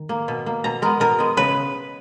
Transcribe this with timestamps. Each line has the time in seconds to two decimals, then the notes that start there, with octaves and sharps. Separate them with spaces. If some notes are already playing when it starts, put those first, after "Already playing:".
Already playing: D#3
0.09 A#3
0.28 B2
0.46 A#3
0.64 B2 A#5
0.82 G#3 B3 A#4
1.00 B2 A#4
1.19 G#3 B3
1.37 C#3 B4